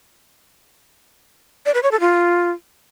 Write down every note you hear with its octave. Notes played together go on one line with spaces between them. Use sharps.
D5
B4
C#5
A4
F4